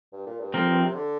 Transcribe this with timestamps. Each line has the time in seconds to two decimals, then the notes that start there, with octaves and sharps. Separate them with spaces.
0.13 G2
0.26 A#2
0.40 G2
0.54 F2 F3 C4 A#4
0.68 G2
0.82 C3
0.95 D3